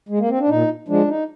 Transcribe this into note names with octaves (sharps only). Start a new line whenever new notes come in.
G#3
A#3
C4
D4
A#2 D#4
F3 G#3 D4
D#4